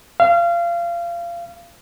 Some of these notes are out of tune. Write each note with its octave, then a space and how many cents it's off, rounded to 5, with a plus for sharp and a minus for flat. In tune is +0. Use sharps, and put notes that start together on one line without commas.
F5 -25